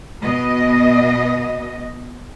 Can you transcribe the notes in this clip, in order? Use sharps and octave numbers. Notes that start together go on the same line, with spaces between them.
B2 B3 D#5